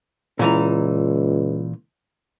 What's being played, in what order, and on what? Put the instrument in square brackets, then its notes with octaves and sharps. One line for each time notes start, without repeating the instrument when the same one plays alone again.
[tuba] C#2 [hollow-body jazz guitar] A#2 E3 A#5